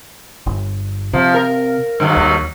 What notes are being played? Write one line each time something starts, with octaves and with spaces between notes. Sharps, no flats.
G1
C3 F3
A#4
G2 D#3 F#3
D#2